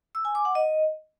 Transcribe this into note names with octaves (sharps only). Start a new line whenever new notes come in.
E6
G#5
D6
F#5
D#5